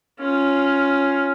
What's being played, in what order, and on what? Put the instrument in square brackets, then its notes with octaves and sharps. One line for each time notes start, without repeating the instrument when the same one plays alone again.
[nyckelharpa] C#4 F4